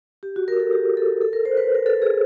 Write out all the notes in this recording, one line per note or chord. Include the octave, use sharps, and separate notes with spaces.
G4
F#4
A#4
A4
G4
A4
A4
A#4
C5
B4
A#4
A4
G#4